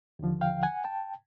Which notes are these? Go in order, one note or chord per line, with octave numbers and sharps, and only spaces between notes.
D#2 D3 F3
F5 G5
F#5 G#5
G5 A5